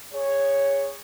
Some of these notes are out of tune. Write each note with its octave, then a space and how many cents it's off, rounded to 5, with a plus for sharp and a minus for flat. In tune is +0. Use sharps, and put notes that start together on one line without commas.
G#4 -25 C#5 +0